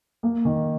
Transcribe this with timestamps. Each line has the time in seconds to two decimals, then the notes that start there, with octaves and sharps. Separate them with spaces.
0.23 A#3
0.45 D#3